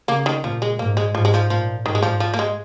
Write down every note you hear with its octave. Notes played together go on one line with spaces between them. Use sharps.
C#3 A#3
D#3
A#2 F3
G#3
G#2 A#3
G#3
G#2 F3
G#3
F3
A#2 F3
G#2 D#3
G#3
F3
F3
A#3
G#3